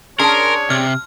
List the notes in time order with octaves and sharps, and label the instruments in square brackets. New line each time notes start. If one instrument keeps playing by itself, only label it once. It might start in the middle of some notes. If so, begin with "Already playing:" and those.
[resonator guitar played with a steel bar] C#4 D4 G#4 [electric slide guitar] A#4 [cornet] C#5 [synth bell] A5 C6
[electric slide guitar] C3 [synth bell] F6